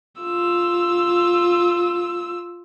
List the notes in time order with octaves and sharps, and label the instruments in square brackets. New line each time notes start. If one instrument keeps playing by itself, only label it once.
[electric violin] F4 E6